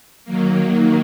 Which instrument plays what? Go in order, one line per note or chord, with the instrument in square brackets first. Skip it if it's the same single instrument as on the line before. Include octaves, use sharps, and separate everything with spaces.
[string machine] D#3 F#3 A#3